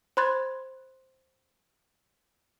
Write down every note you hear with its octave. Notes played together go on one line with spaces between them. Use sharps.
C5 B5 C6 F#6 G#6 A6